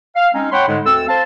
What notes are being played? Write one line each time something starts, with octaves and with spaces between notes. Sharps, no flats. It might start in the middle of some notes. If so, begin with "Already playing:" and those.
F5
G#3 C4 C#4 D#4
C#5 F#5 G5 B5 C6
G#2 D3 G#3
D2 C4 A4 E6
C5 F5 A5